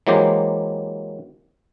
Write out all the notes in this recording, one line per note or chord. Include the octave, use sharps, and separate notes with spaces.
E3 F#3 G#3 A#3 G4 C5